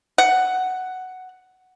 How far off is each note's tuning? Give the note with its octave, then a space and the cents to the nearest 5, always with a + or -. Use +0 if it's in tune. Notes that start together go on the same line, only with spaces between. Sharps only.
F#5 +5